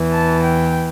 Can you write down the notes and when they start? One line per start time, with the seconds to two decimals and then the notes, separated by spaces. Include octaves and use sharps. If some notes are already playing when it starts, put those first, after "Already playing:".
Already playing: E2 E3
0.13 A5
0.43 G5